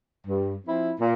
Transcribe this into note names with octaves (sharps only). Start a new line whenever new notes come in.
G2
F3 C4 E4
A#2